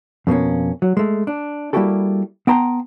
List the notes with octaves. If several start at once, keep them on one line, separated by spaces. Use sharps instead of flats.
F2 B2 A#3 C#4
F#3
G#3 A3
D4
G3 A#3 E4 F#4 G4 A4
B3 G5 A5 A#5 C6